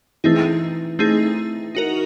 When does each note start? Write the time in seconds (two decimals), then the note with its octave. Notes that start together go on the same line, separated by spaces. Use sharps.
0.24 E3 A3 C4 D#4 G#4
0.99 A3 C4 D#4 G#4
1.75 D#4 F#4 A#4